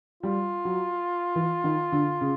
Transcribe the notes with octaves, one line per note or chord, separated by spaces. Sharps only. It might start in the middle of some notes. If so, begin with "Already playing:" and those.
G3 F4
F#3
E3
D#3
D3
C#3